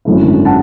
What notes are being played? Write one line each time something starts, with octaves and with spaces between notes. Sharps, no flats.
G#1 F#2 D3 A3 E4
F#5 A5